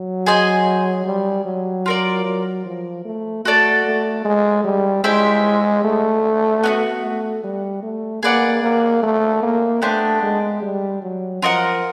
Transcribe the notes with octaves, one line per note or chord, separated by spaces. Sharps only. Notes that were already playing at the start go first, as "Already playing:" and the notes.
Already playing: F#3
G#4 C5 D#5 G#5
G3
F#3
F4 A#4 D5
F#3
F3
A3
A3 F#4 A4 D5
A3
G#3
G3
G#3 E4 G4 C5 E5
A3
B3 D#4 F#4
A3
G3
A3
A#3 G#4 B4 D5 F#5
A#3
A3
A#3
A3 B3 D4 G4 C5
G#3
G3
F#3
F3 F4 A#4 D#5 F#5